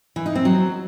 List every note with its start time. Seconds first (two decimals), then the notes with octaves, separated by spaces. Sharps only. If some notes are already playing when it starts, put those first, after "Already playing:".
0.16 E3
0.26 D#4
0.35 C4
0.45 F#3